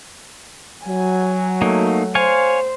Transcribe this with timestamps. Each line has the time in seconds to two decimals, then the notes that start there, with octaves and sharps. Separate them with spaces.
0.86 F#3 G#5
1.62 A3 A#3 D#4
2.15 C5 C#5 F5 G#5